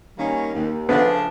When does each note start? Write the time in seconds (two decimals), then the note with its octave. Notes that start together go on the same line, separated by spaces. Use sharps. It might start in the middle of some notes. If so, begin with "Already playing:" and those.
0.17 D#3 G3 A#3 C#4
0.53 D#2
0.89 C#3 F3 A3 B3 D4